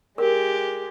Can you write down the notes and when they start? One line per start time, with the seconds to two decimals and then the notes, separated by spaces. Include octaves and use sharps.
0.18 G#3 G4 A#4